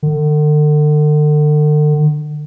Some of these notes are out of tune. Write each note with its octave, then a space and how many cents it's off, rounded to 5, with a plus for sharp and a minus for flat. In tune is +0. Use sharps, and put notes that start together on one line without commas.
D3 +40